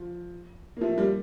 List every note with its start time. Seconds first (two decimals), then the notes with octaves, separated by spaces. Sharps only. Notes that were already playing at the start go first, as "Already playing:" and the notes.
Already playing: F3
0.77 A#3
0.81 F3 A3
0.98 G3 A#3